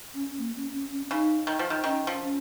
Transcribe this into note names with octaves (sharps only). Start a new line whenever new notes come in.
C#4
A#3
C#4
C#4
C#4
C#4
C#3 D#4
D#3
F3
D#3
D#3 C#4
F3
C#4